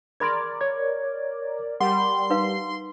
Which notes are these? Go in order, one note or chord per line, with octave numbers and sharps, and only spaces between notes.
G#4 A#4 D5 B5 C6 G#6
C#5 G#6
G3 A#4 F#5 C6
D#4 B4 F5